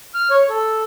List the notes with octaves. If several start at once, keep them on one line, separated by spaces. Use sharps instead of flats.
F6
C#5
A4